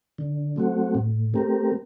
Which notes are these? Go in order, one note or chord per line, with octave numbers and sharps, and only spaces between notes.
D3
F#3 A3 C4 F#4
A2
A3 C4 G4 A#4